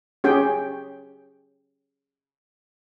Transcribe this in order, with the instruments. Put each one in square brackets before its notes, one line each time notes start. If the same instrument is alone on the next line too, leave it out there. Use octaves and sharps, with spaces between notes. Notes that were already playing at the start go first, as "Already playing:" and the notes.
[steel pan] C#4 G4 G#4 G5